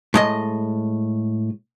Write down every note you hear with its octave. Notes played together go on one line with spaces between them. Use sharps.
A2 G#3 D#5